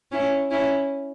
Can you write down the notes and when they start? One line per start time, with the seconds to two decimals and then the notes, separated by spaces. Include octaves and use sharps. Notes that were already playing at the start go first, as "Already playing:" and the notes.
0.11 C#4 E4
0.51 C#4 E4